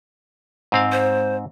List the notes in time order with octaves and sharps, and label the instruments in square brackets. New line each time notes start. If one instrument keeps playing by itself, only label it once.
[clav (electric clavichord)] G#2 C4 F5
[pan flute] C5